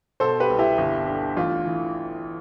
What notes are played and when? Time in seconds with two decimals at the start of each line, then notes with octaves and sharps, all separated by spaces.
0.20 B2 A4 C5
0.40 G4 B4
0.50 C2
0.59 E4 G4
0.78 G1
1.07 D3
1.37 A1 F4
1.65 E3